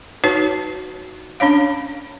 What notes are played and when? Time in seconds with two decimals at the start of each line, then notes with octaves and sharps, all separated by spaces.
0.24 D#4 F#4 B4 C#5 A5
1.40 C#4 D4 C#5 F5